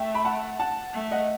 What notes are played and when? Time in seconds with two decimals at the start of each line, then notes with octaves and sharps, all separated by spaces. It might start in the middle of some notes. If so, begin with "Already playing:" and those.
Already playing: A3 E5 G5
0.14 B5
0.25 F#5 A5
0.59 F#5 A5
0.94 A3
1.11 D#5 F#5